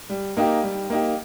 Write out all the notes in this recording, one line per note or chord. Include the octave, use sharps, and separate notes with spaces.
G3
A#3 D#4 G4
G3
A#3 D#4 G4